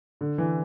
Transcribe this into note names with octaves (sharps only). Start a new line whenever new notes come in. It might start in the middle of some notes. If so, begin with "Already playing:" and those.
D3
E3